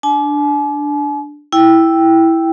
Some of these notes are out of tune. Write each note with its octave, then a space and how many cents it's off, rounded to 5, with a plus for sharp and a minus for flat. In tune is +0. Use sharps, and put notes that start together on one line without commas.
D4 +0 G#5 +45
E4 +0 G5 +0